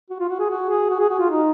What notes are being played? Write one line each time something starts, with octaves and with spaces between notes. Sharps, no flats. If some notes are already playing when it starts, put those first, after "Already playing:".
F#4
F4
F#4
G#4
F#4
G#4
F#4
G#4
F#4
F4
D#4